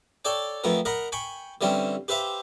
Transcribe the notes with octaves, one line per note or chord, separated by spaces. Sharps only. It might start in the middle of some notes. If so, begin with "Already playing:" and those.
A4 C#5 D5 G5
F2 A3 B3 A#4
A#4 D#5 F#5 A#5 B5
G5 G#5 B5 C#6
D3 E3 G3 C4 C#4
G4 B4 C5 E5 F5